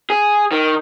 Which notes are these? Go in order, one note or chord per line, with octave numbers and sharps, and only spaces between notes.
G#4
D#3